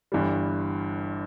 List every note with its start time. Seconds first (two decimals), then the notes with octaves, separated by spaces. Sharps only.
0.12 G1 G2 E3 G3